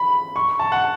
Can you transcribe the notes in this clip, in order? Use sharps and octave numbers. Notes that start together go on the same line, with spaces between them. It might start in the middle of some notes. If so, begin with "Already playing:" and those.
Already playing: B5
C#6
A5
F#5